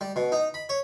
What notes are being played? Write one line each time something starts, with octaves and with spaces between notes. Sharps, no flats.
G3
B2
D#4
B5
C#5